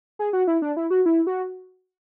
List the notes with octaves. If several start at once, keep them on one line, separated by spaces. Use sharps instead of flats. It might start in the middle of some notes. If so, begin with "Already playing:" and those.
G#4
F#4
E4
D4
E4
F#4
E4
F#4